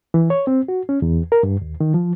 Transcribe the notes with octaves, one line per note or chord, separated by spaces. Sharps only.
E3
C#5
C4
F#4
C#4
E2
A#4
G2
D#2
D#3
F3